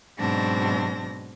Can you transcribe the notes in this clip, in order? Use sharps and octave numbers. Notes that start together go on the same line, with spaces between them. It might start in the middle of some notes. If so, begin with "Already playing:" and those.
G#2 B2 F#3 C4 D4 A#6